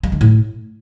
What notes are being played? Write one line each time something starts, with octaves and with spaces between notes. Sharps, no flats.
G#3
D3
A2